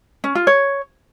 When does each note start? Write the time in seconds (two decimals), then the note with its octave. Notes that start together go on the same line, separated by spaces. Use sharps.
0.24 C#4
0.35 F4
0.47 C#5